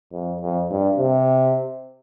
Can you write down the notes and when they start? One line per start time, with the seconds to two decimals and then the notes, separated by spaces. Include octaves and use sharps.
0.12 F2
0.41 F2
0.70 G2
0.98 C3